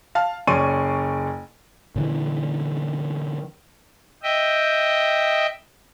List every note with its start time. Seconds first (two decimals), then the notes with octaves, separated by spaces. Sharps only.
0.15 F5 A5 F6
0.47 F#1 C#4 D5 C6 C#6 D#7
1.96 A#2 D3 E3
4.23 D#5 E5 G5